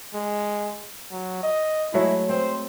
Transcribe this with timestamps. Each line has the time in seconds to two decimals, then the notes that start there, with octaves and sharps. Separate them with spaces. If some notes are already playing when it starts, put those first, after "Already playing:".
0.14 G#3
1.11 F#3
1.43 D#5
1.94 F#3 G#3 A3 E4
2.29 C4 C5